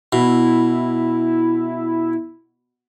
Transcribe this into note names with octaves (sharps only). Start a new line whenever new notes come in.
B2 E4